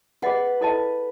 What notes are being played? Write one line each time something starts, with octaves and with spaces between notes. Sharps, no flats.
G#4 B4 D#5 F#5
E4 A4 D#5 A5